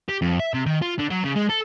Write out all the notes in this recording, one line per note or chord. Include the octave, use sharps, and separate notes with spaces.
G4
F2
E5
C3
D#3
F4
D3
F#3
C#3
G#3
A4